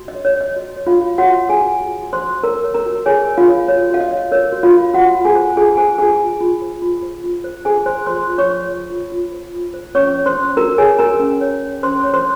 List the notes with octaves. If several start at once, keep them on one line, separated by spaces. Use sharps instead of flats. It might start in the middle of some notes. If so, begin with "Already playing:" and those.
Already playing: F#4
D#5
C#5
C#5
C#5
D#5
F#4
C#5
F4 F5
F#4
F#4 C#5 F#5
C#5
G#4 G#5
F#4
F#4
F#4
C5 C6
F#4
A#4 C#5 A#5
C#5
A#4 A#5
F#4
G#4 C#5 G#5
A#4
F4 F5
C#5
F#4 C#5
F#4 F5
D#5
C#5
A#4 C#5
F#4
F4 F5
F#4
F4 F#4 F#5
F4
G#4 G#5
C5
F4 G#4 G#5
G#4 C5 G#5
F4 G#4 G#5
F4
F4
C5
F4
C5
F4
C5
G#4 C5 G#5
C5 C6
F4 C5 C6
F4
C#5 C#6
C5
F4
F4
F4
C5
F4
C5
C#4 C#5 C#6
C#5
C5 C6
C#4
F#4 A#4 A#5
G#4 C#5 G#5
F#4 A#4 A#5
C#4
C#5
C#4
C#4 C5 C6
C#5
C5 C6